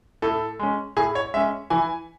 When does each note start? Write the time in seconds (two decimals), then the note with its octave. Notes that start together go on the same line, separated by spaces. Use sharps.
0.22 A2 A4
0.59 G#3 C#4
0.96 A2 G#4
1.15 C#5
1.34 G#3 E5
1.37 C#4
1.70 E3 G#5